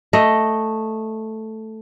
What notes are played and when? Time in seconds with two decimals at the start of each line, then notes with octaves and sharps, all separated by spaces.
0.13 A3 D#5